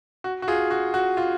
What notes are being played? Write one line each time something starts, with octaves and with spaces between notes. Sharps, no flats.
F#4
F#4
F4 G#4
F#4
F#4
F4